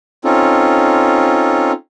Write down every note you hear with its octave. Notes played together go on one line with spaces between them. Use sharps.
C4 C#4 D#4 F4 A4